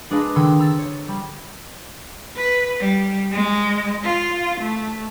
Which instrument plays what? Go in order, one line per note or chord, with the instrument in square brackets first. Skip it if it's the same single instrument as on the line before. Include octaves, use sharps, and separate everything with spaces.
[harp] G#3 D4 G#4 A#4 B4 F5
D3 D#3 C6 E6 G#6
A#5 E6 A6
C#5
G3
[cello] B4
G3
G#3
F4
A3